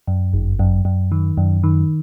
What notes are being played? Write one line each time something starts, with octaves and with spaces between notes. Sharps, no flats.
F#2
G1
F#2
F#2
D#3
F#2
D#3